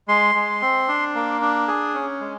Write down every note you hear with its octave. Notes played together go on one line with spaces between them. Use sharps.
G#3 C6
G#3
C4
D4
A#3
D4
G#4
C#4
G#3